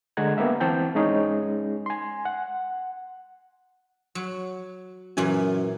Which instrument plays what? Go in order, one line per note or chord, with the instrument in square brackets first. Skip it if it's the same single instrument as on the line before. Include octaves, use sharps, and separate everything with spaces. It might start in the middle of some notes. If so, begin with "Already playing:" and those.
[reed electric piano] D3 G#3 F#5 A#5 G#6
A#3 B3 G4 E5 F#5
E3 C4 E4 G5 A5 G6
G#3 C#4 D#4 G#4
G#5 C6
F#5
[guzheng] F#3
[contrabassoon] F#2 [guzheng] A#2 E3 G#5